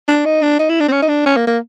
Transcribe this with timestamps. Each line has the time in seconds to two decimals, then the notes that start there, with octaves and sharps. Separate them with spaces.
0.08 D4
0.25 D#4
0.42 D4
0.59 D#4
0.69 E4
0.80 D4
0.88 C4
0.92 C#4
1.02 D#4
1.08 D4
1.26 C#4
1.36 A#3
1.47 A#3